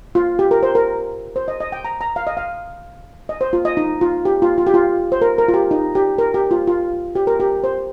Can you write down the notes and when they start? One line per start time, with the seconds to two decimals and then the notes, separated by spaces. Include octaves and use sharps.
0.15 F4
0.39 G4
0.51 A#4
0.63 C5
0.75 A#4
1.36 C5
1.48 D#5
1.60 D#5
1.72 G5
1.85 A#5
2.01 A#5
2.16 F5
2.27 D#5
2.37 F5
3.29 D#5
3.41 C5
3.53 F4
3.65 D#5
3.77 D#4
4.01 F4
4.25 G4
4.42 F4
4.58 F4
4.67 G4
4.74 F4
5.12 C5
5.22 A#4
5.38 A#4
5.49 F4
5.54 G4
5.71 D#4
5.95 G4
6.18 A#4
6.34 G4
6.51 F4
6.67 F4
7.15 G4
7.27 A#4
7.40 G4
7.64 C5